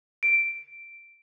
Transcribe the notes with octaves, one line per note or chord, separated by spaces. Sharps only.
D7